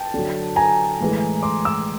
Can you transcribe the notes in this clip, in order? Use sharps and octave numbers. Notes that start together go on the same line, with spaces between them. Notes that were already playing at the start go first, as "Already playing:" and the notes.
Already playing: G5 A5
D3 F#3
G#5 A#5
A2 E3 G#3
C6 D6
D6 E6